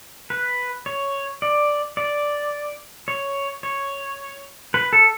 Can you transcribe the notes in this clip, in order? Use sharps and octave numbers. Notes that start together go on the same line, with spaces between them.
B4
C#5
D5
D5
C#5
C#5
B4
A4